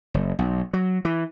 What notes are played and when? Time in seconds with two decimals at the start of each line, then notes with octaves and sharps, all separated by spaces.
0.14 F#1
0.39 B1
0.73 F#3
1.05 E3